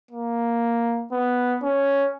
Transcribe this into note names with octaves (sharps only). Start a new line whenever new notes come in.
A#3
B3
C#4